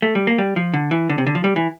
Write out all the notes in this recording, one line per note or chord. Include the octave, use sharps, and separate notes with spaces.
A3
G3
A#3
G3
F3
D3
E3
D3
C3
D3
F3
G3
E3